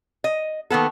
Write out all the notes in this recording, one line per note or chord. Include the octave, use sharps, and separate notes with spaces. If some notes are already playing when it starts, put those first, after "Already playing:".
D#5
D#3 A#3 B3 A4